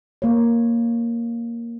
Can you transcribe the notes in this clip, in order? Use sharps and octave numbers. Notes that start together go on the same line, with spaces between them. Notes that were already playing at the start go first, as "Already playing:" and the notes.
A#3 C#5